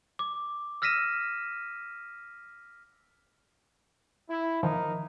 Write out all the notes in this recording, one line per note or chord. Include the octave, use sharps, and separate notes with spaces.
D6
E6 F6 A#6 B6 D#7 E7
E4
D#3 F3 A#3 D#4 A#4